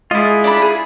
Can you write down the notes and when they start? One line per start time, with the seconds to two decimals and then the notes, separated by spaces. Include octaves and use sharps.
0.11 G#3 E4 F4 D#5
0.44 D4 B5
0.62 G#4